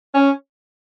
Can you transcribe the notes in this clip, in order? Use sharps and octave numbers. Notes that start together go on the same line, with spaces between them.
C#4